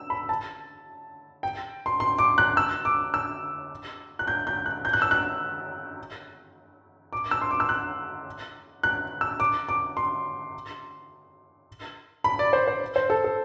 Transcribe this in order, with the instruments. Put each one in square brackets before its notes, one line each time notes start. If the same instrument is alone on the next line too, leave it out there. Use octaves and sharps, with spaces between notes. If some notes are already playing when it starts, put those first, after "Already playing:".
Already playing: [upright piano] E6
B5
A5
G5
C6
C6
D6
F#6
E6
D6
E6
F#6
G6
G6
F#6
G6
F#6
E6
F#6
D6
E6
C6
D6
E6
F#6
F#6
E6
D6
D6
C6
B5
D5
C5
C5
C5
A4
A4